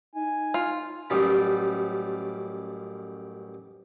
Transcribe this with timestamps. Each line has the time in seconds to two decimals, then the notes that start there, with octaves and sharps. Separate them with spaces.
0.15 D#4 G#5
0.54 F4
1.10 A1 F#2 G3 D#4 A5 B5